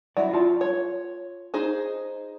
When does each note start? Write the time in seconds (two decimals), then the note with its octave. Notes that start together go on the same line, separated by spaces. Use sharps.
0.17 F#3 E4 D5
0.34 F4 A5
0.61 C#5
1.54 D#4 G#4 C5